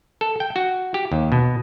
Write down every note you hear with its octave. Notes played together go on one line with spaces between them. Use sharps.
A4
G5
F#4
G4
D#2
B2